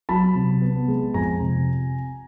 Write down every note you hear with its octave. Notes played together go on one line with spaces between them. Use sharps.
F#3 A5 B5
C3
B3
G#3
F2 G#5 A#5
C3